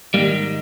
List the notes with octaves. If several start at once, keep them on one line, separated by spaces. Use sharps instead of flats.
G#2 D#3 G3 A#3